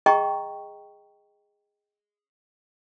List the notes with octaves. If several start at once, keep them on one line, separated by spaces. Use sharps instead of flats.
G#4 D#5 G5 A#5 C#6